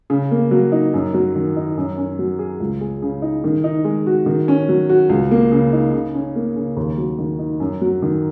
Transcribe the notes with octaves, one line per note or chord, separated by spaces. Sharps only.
C#3
A#3
F#3
D#4
F#2
F#3
D#3
D#4
F#2
C#4
F#3
G#4
C#2
G#3
C#3
D#4
D#3
D#4
G#3
F#4
D#3
C#4
F#3
F#4
C#2
A#3
C#3
D#4
C#3
C#4
A#3
C#3
D#2
F#3
D#3
D#4
F#2
F#3
D#3